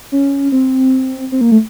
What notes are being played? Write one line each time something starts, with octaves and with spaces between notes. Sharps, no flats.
C#4
C4
C4
A#3
A3